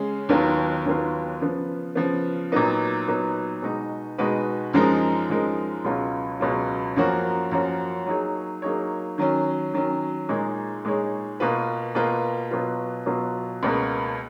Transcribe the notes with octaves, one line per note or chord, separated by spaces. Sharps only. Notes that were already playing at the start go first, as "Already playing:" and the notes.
Already playing: C#3 G#3 C#4 G#4
D#2 D#3 F#3 B3 F4
D#2 D#3 F#3 B3 F4
C#3 F3 B3
C#3 F3 B3
A#2 F#3 B3 D#4
A#2 F#3 B3 D#4
B2 G#3 D#4 F#4 B4
B2 G#3 D#4 F#4 B4
F#2 F3 G#3 D#4 A#4
F#2 F3 G#3 D#4 A#4
C#2 B2 F#3 C#4 F4
C#2 B2 F#3 C#4 F4
F#2 F3 A#3 C#4 F#4
F#2 F3 A#3 C#4 F#4
F#3 A#3 D#4 G#4 C#5
F#3 A#3 D#4 G#4 C#5
D#3 F#3 C#4
D#3 F#3 C#4
A#2 G#3 D#4 G#4 C#5
A#2 G#3 D#4 G#4 C#5
B2 A#3 F4 B4
B2 A#3 F4 B4
B2 F#3 B3 F4
B2 F#3 B3 F4
C#2 B2 A#3